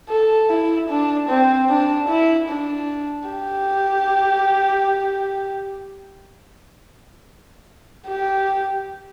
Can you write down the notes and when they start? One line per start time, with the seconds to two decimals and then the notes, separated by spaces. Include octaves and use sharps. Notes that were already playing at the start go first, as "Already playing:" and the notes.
0.09 A4
0.50 E4
0.89 D4
1.29 C4
1.70 D4
2.08 E4
2.49 D4
3.29 G4
8.08 G4